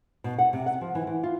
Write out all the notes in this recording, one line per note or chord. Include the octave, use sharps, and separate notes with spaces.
B2
F#5
C3
F#5
F3
E3
E3
F4